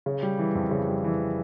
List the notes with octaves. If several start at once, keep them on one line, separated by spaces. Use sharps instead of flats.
C#3
G3
E3
F2
C#3
G3
E3